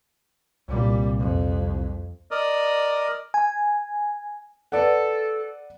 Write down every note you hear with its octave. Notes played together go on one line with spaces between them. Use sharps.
C2 A#2 G3
F2
A#4 D5 D#5
G#5
A4 B4 D5 F#5